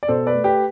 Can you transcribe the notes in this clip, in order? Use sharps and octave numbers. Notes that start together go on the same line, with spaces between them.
D5
B2 A4 C5
B4 D5
A3
G4 B4